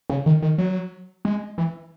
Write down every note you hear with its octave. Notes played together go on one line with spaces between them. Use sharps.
C#3
D#3
D#3
F#3
G#3
E3